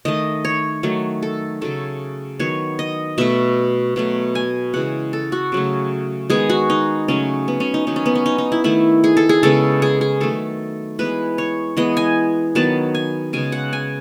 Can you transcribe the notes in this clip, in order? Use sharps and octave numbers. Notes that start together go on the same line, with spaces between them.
D#3 A3 D#5
C#5
D#3 F#3 A3
A4
C#3 F#3 A3 A4
D#3 F#3 B3 C#5
D#5
B2 A3 E5
B2 F#3 A3
G#5
C#3 E3 G#3 F#5
A4
F#4
C#3 F#3 A3
D#3 G#3 B3 G#4
F#4
D#4
C#3 F#3 A3 C#4
B3
C#4
D#4
D#3 F#3 B3 D#4
C#4
B3
C#4
D#4
D#4
E4
D#3 A3 E4
G#4
A4
G#4
C#3 G#3 B3 A4
G#4
G#4
D#3 F#3 A3 A4
E3 G#3 B3 B4
C#5
E3 G#3 B3 D#5
G#5
D#3 F#3 B3 A5
G#5
C#3 G#3 B3 G#5
F#5
G#5